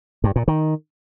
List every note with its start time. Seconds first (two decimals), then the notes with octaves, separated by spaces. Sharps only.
0.24 G2
0.36 A#2
0.48 D#3